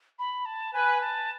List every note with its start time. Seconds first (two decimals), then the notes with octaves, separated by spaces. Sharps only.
0.19 B5
0.46 A5
0.74 B4 G#5
1.01 A5